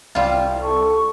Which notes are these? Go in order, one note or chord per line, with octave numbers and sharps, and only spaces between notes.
C2 G3 F4
A4 C#6